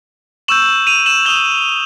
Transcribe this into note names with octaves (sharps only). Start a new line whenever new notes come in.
C#6 E6 G6 E7 F#7
D#7 F7
E7 F#7
D#6 G6 F7 G7